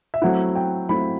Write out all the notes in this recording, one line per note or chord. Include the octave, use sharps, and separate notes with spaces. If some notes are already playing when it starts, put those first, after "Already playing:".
E5
F#3 A3 C4 E4 F#5
G5
F#3 A3 C4 E4 B5